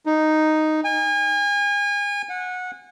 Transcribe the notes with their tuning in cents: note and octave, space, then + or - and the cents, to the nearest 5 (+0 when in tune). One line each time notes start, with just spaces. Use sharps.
D#4 -5
G#5 -35
F#5 -20